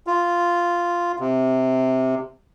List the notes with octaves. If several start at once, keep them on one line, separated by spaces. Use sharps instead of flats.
F4
C3